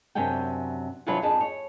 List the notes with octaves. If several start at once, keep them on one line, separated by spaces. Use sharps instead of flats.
F#2 C3 C#4 D4 G5
C3 E3 F#3 D4 F4 B4
F2 D4 D#4 G#4 B4 A5
C#5